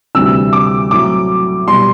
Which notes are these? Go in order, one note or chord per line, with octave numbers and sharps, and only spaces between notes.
D2 C3 E3 G3 C4 E6
D6
A2 F#3 C4 D6
B2 G3 C6